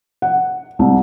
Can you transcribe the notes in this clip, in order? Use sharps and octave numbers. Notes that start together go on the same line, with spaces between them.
F#5
C2